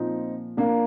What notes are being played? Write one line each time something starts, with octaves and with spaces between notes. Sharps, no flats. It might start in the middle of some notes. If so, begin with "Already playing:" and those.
Already playing: A#2 F3 C4 D#4
A#3 D4